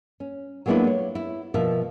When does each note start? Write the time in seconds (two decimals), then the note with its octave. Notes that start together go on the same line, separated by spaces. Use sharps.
0.20 C#4
0.66 F#3 G#3 A#3 B3 D4 E4
0.87 C#5
1.15 E4
1.54 B2 F3 A#4 E5